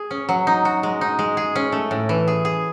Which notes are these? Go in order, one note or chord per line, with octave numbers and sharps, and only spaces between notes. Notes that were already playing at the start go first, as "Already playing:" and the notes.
Already playing: G#4
C#4
F#3
D#4
F#4
G#3
D#4
G#3
G#4
C#4
A3
A2
E3
G#4
G#4